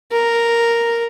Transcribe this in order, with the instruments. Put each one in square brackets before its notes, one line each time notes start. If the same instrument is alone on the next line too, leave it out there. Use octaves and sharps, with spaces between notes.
[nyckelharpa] A#4